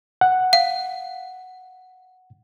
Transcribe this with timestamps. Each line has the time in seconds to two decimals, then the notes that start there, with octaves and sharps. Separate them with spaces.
0.21 F#5
0.53 F5